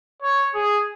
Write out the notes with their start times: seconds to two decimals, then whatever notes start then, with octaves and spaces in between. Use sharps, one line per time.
0.22 C#5
0.54 G#4